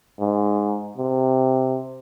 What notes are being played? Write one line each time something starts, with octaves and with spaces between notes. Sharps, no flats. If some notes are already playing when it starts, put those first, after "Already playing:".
G#2
C3